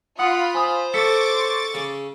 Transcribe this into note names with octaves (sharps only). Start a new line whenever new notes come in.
F4 F#5 B5 D#6
C5 G#5 D#6
A4 C#6 D6 E6 A6 B6 C#7
C#3